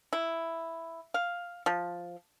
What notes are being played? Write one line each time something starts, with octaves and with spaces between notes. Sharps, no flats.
E4
F5
F3